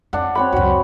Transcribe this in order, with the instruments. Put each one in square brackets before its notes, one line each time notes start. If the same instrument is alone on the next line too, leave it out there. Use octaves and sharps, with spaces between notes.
[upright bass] F2 [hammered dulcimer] D4 F#5
[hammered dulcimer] C4 C#5 B5
[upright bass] C#2 F#2 [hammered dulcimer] F#4